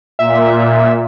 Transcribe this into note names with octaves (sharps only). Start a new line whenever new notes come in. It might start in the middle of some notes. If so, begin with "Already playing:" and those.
A#2 E5